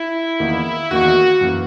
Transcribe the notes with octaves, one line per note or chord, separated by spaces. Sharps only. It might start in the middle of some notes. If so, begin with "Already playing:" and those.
Already playing: E4
E2 D#3 A#3 D#4
E2 D#3 A#3 D#4 F#4
F#2 E3 A#3